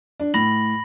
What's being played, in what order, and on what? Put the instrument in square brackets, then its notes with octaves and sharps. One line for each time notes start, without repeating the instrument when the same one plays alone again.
[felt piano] D4
[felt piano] A2 [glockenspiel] B5 A#6 F#7